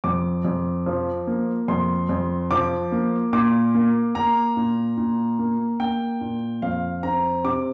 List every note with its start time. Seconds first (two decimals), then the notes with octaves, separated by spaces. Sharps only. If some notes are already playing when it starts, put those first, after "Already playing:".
0.04 F2 D6
0.45 F2
0.86 F3
1.27 A#3
1.68 F2 C6
2.09 F2
2.51 F3 D6
2.92 A#3
3.33 A#2 D6
3.74 A#3
4.15 A#3 A#5
4.57 A#2
4.97 A#2
5.39 A#3
5.80 A#3 G5
6.21 A#2
6.62 F2 F5
7.03 C4 A#5
7.44 C3 D6